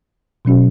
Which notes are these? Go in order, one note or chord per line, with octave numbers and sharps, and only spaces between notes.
B2 F#3 C#4 F#4